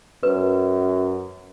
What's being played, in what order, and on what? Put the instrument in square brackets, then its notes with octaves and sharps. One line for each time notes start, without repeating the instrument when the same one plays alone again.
[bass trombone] F#2 [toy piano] B4